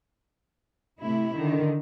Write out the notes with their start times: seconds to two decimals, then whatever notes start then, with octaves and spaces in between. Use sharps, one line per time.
1.02 C3 A3 E4
1.36 D3 D#3